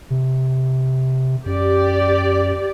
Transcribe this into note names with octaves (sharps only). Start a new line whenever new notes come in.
C3
F#2 G4 D5